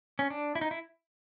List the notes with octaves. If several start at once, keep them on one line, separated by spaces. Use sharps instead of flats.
C#4
D4
E4
D#4
E4